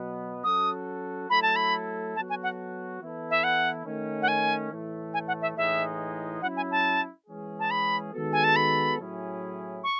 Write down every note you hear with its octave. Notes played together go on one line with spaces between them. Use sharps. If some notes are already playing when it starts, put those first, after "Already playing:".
Already playing: B2 F#3 B3
F#3 C#4 F#4 A4 D#6
F#3 A3 E4 A4 B5
A5
B5
F#3 B3 F#4 A4 A5
G#5
F#5
E3 B3 E4 A4
E5
F#5
D#3 A3 C#4
F#5
G#5
A2 E3 A3
G#5
F#5
E5
A2 E3 G#3 D#4 G#4 E5
F#3 C#4 E4 F#5
G#5
A5
E3 G#3 C#4 G#4
A5
B5
D#3 G#3 B3 F#4 A4
G#5
A5
B5
A2 F#3 C#4 E4 G#4
C#6